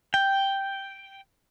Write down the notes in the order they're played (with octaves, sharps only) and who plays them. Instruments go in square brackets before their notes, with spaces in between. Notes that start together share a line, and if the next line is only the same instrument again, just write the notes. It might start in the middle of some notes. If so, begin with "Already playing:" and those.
[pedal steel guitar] G5